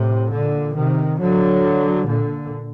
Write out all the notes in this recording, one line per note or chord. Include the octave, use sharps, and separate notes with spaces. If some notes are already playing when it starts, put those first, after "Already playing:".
Already playing: A2 C3
A#2 D3
C3 D#3
D3 F#3
A#2 D3